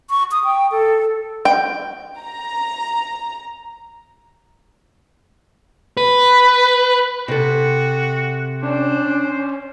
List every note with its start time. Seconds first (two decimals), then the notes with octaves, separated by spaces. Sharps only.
0.10 C#6
0.31 D#6
0.44 G5
0.71 A4
1.45 G5
2.19 A#5
5.97 B4
7.28 C3 F#4 A4
8.63 C#4 D4 C5